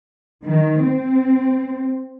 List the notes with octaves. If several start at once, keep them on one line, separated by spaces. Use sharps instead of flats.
D#3
C4